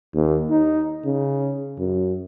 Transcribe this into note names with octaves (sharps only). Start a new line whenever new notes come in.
D#2
D#4
C#3
F#2